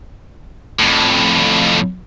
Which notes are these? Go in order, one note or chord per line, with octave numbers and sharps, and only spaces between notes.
F2 A2